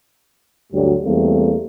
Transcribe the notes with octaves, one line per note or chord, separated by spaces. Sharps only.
D2 G2 F#3 G3
E2 G3 A3 A#3 C4